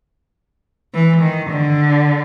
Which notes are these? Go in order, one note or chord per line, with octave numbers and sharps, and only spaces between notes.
E3
D#3
D3